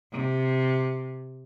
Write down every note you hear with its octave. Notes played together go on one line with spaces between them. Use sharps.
C3